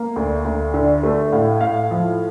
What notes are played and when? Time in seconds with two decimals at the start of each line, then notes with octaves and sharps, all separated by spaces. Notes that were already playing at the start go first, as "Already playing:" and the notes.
Already playing: A#3
0.16 D2
0.44 D2
0.74 D3
1.03 A3
1.32 A2 F5
1.61 A2 F5
1.91 F3